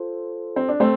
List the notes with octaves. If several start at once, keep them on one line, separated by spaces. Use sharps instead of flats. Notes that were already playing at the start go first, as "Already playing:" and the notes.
Already playing: F4 A4 C5
C4
D4
A3 C4